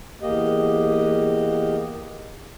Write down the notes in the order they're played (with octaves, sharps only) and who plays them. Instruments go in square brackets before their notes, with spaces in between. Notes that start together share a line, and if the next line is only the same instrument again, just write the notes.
[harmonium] E2 A#3 G4 D#5